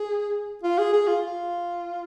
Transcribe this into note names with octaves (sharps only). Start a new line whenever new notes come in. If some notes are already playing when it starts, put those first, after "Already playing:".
Already playing: G#4
F4
G#4
G#4
F4
F4